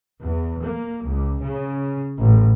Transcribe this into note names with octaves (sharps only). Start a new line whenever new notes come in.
E2
A#3
C#2
C#3
A1